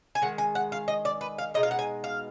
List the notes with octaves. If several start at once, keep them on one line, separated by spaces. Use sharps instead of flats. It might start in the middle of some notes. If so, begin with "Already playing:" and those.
G#5
D#3 G#3 F#5
G#5
F#5
F5
D#5
D5
B4
F5
B2 G#3 D#4 D#5
F5
F#5
G#5
F5